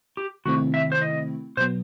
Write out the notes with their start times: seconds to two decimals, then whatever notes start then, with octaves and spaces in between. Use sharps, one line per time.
0.17 G4
0.46 C3 D#3 A3 C4 E4 F#4
0.74 E5
0.92 C5
1.02 D#5
1.57 B2 F#3 B3 C5